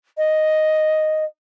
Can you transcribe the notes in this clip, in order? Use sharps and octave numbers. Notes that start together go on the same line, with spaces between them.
D#5